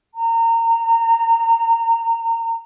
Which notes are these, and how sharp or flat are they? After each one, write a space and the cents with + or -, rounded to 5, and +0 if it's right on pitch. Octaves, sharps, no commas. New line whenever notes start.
A#5 -25